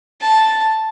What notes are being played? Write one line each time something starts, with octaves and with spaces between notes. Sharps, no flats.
A5